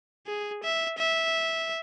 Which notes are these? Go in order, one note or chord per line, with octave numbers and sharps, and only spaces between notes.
G#4
E5
E5